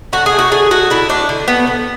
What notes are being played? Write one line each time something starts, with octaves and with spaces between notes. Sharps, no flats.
D3 F#4
G#4
A3
F#4
D3 G#4
A3 F#4
D3 E4
A3 D4
D3
A3 B3
D3